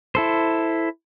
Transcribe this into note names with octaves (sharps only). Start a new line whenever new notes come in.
E4 A4 C5